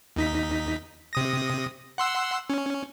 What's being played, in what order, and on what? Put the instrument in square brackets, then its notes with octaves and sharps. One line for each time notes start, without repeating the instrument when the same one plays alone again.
[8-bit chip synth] D#2 D#4 B6
C3 D#6 A#6
F#5 C6 E6
C#4